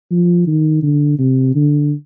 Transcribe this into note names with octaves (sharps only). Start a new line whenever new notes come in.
F3
D#3
D3
C3
D3